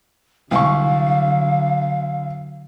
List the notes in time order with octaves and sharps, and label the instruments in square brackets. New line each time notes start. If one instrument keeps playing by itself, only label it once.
[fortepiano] C2 C#6 [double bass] D3 F#3 [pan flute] F5